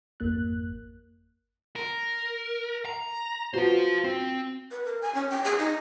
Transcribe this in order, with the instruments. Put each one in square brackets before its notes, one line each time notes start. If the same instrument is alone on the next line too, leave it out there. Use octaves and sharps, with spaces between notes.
[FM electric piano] G#1 F2 A#3 F#6
[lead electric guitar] A#4
A#5
[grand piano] F4 F#4 B4 [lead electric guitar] C5 F5
[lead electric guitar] C4
[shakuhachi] B4
A#4
G#5
C#4
G5
G#4
D#4